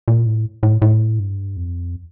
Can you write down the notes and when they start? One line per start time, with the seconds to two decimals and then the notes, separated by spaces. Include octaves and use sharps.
0.08 A#2
0.26 A2
0.63 A2
0.82 A2
1.19 G2
1.57 F2